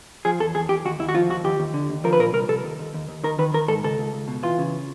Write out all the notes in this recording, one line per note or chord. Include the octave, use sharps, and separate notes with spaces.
F3 G#4
E2 A4
E2 G#4
E2 G4
D#2 F#4
D#2 E4
F#4
F3 F4
D#2 F#4
D#2 G4
D#2
D3
D#2
F3 A#4
B4
A#2 A#4
C2 A#4
C2 A4
D#2
D#2
D#2
D#2
D#3 A#4
D#3 B4
D#3 A#4
G#2 A4
C#2 A4
C#2
C#2
B2
E3 F4
C#3